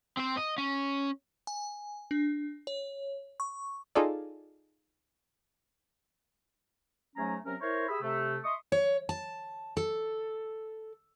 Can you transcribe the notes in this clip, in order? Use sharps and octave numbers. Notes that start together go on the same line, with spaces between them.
C4 C5
D#5
C#4
G#5
D4
C#5
C#6
D#4 F4 G#4 A4 D5
G#2 F#3 A3 C#4 G#5 A#5
C3 F#3 C4 C#4 A#4
E4 A#4 C5 C#5
G4 G#4 E5 B5 D#6 E6
C3 A3
D#5 E5 C6 C#6 D#6
C#5
A5
A4